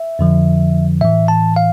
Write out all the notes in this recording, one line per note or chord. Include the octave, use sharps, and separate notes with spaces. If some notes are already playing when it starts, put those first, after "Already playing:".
Already playing: E5
F2 D3 F3
A2 E3 E5
A5
F5